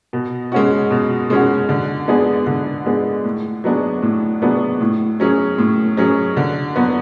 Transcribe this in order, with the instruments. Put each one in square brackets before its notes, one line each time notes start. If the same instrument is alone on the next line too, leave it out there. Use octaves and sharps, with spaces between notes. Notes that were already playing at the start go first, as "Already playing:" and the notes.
[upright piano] B2
G#3 C#4 F#4
B2
G#3 C#4 F#4
D3
G#3 B3 D4 G#4
D3
G#3 B3 D4 G#4
A2
F#3 B3 D4 G#4
A2
F#3 B3 D4 G#4
A2
F#3 C#4 G#4
A2
F#3 C#4 G#4
D3
F#3 B3 F#4